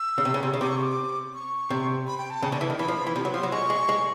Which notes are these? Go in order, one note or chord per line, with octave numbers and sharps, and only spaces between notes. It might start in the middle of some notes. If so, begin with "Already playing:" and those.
Already playing: E6
C#3
C3
C#3
C3
C#3
C3 D6
C#6
D6
C#6
C3
B5
G5
A5
C#3
D3
E3
D#3
E3 B5
F3
E3
C3 B5
F#3
F3 C6
F#3
G#3 C#6
G#3
G#3